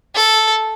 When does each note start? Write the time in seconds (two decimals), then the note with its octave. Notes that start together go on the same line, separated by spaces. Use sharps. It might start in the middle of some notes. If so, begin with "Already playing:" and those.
0.15 A4